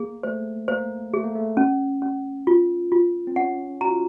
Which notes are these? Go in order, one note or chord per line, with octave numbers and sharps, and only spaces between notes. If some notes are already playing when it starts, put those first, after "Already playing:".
Already playing: A#3 G#4
A3 C5
A#3 C5
A3 G#4
A#3
A3
C#4
C#4
F4
F4
C4
C#4 F#5
F#4 A#5
F4